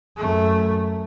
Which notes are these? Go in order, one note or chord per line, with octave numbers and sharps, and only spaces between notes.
F#2 A3